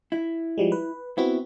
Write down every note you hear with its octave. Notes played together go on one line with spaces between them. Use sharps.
E4
F3 G3 G#3
B4
B3 C4 E4 F#4